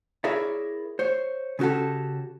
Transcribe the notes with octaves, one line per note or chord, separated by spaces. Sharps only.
E4 G#4 A#4 C#5 D5 E5
C5 C#5
C#3 C#4 F#4 G4 A4